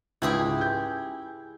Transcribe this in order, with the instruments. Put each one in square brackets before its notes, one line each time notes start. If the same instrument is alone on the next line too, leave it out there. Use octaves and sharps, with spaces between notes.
[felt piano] C#2 G#2 [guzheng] E4 G4 G#4
[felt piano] G6